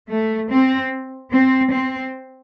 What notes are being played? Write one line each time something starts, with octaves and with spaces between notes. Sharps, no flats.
A3
C4
C4
C4